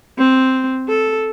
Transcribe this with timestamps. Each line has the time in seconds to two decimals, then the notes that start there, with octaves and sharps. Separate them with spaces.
0.18 C4
0.89 A4